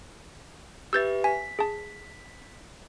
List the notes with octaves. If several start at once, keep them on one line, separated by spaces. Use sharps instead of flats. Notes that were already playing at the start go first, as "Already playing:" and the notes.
G4 B4 E5 E6 G6 A6
G#5 B6
G#4 A5